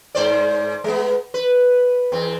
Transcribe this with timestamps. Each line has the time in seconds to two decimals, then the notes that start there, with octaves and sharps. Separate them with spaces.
0.15 G#2 C5 D5
0.84 G#3 B3
1.34 B4
2.12 E2 C4